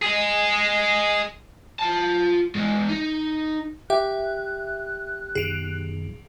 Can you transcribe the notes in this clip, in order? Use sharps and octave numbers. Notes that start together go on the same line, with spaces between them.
G#4 D#5
F4 A5
E2 G#3
D#4
G4 E5 F#6
F#2 B2 D#3 G#4 D7 F7